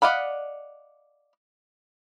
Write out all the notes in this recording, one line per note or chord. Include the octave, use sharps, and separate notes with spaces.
D5 D#5 F5 F#5 B5